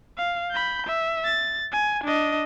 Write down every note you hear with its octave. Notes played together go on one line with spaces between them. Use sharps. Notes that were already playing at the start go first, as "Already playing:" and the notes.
F5
B5 G6
E5
A6
G#5
D4 D#5